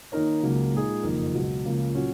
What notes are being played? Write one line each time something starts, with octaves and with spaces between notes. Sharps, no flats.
D#3 A#3 D#4 A#4 C#5
C#2 C#3 F#3 A#3
A#2 G#3 D#4 G#4
F#1 F2 D#3 A#3
C#2 B2 F#3
C#2 C#3 F3 A#3
A#2 F#3 C#4 F#4